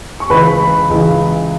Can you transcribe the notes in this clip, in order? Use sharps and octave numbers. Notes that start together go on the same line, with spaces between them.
C#6
C#2 C#3 E3 B4 B5
C#2 C#3 E3